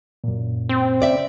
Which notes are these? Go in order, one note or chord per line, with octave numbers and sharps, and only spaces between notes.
F#2 A#2
C4
C#3 D5 E5